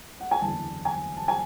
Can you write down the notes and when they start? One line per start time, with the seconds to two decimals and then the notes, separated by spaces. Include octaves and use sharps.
0.20 F#5
0.31 G#5
0.41 F#1 E2 D3 A5
0.85 G#5
1.17 A5
1.28 G#5